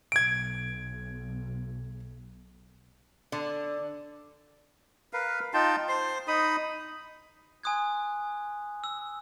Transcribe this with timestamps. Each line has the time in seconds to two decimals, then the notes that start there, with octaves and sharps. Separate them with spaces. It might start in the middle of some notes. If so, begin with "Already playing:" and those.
0.12 B1 G#6 D7
3.32 D3
5.13 A#4 B4 F5
5.54 D#4 F4 G5 A5
5.88 C5 C6
6.28 D#4 B5 D#6
7.63 G#5 C6 D#6 F#6 G#6
8.84 E6